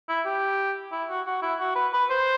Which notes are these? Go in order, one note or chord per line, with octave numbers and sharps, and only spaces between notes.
E4
G4
E4
F#4
F#4
E4
F#4
B4
B4
C5